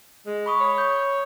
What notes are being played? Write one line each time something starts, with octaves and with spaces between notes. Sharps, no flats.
G#3
B5 C#6 D#6
C#5
G6